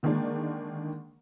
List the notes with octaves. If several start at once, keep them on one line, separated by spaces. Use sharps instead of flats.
D3 D#3 G#3 A#3 D4